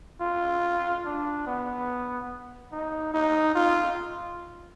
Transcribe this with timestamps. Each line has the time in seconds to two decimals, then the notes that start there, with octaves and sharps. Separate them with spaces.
0.21 F4
1.05 D4
1.46 B3
2.72 D#4
3.14 D#4
3.55 F4